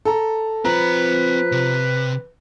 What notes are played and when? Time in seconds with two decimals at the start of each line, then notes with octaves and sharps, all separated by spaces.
0.05 A4 A#5
0.65 F3 C4 B4 A#5 B5
1.52 C3